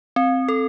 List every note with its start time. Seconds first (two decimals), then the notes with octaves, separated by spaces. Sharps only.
0.16 C4
0.49 A4